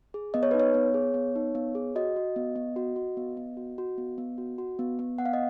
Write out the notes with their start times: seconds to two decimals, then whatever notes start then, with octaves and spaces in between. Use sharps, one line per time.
0.14 G#4
0.34 B3 D#5
0.43 C#5
0.51 D#4 B4
0.60 C#5
0.74 B3
0.94 G#4
1.14 B3
1.35 D#4
1.55 B3
1.75 G#4
1.96 F#4 D#5
2.16 F#4
2.36 B3
2.56 B3
2.76 F#4
2.96 F#4
3.17 B3
3.37 B3
3.57 F#4
3.78 F#4
3.98 B3
4.18 B3
4.38 F#4
4.58 F#4
4.79 B3
4.99 B3
5.18 B3 F#5
5.26 F5
5.33 D#5